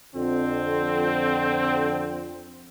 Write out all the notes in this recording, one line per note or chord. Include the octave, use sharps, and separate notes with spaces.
F2 D3 C4